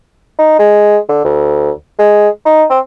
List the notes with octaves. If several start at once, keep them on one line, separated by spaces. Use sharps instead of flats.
D#4
G#3
D3
D2
G#3
D#4
C4